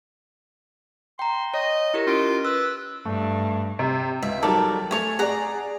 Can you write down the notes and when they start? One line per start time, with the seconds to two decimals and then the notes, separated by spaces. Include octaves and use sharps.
1.19 G5 A#5 C6
1.54 C#5 D#5
1.94 E4 G4 A#4
2.07 C#4 F4 D7
2.45 B4 E6
3.05 G2 A3
3.79 C3
4.22 C#2 E5
4.42 D#2 F#3 G3 A4 A#4 D5
4.91 A3 A4 C#5 G#5
5.19 G#4 D5 F#5 A#5